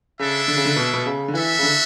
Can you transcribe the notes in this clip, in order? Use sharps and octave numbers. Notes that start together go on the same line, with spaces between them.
C#3 G#3 D4 A4 E5
D3
C#3
D3
B2
B2
C#3
D3
E3 F#4 A4 E5
C#3
D3